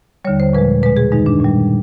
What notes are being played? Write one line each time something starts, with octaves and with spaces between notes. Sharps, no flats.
D#2 D3 G3 C#5
C5
A#2 F3 G#3 B4
B2 G#3 B4
G#4
F#2 D#3 G#3 D#4
D4
A#2 G3